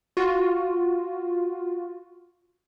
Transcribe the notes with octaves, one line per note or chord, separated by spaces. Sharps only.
F4 F#4